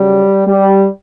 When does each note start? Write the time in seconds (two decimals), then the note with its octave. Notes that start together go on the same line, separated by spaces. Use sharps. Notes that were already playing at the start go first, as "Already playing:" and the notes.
Already playing: C#3 F#3 G3
0.47 G3